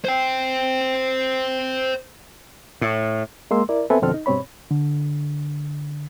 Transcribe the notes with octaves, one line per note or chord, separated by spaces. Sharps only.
C5 G5
A2
G#3 A#3 C6 E6
E4 A#4 D5
B3 C4 A4 B4 E5 G#5
F2 B2 D3 C4 A4 F6
D#4
G2 B2 C4 C#5 B5
D3